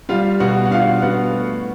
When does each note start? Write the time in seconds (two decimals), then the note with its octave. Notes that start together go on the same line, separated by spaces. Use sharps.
0.09 G3 F4 F5
0.40 B2 F#4 F#5
0.65 F#5
0.71 D4 F4 F5
1.02 B3 F#4 F#5
1.33 A3